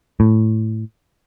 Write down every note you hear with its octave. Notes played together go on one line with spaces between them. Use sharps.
A2